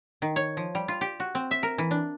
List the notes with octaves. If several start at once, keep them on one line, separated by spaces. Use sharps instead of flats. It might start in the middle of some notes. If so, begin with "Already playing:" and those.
D#3
C#5
F3
G3
F4
G4
F#4
C4
E5
A#4
E3
D4